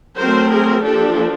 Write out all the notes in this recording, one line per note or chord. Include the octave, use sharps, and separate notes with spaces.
F#3 A3 C4 A#4 C5
G#4 A#4
F3 A#3 D4 G4 A4